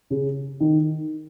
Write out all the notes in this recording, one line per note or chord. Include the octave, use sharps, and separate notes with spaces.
C#3
D#3